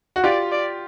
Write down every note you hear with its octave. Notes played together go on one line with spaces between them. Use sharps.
F#4
F4 G4 D5
D5